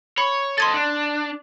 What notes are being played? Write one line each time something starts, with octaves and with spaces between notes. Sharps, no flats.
C#5 B5
A4 D#5 C6 G#6 A6
D4